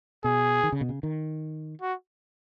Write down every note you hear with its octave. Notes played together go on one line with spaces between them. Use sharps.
B2 G#4
D#3
C#3
B2
C#3
D#3
F#4